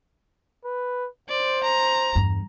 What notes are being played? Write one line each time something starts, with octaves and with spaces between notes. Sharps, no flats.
B4
C5 D5
A#5
E2 G2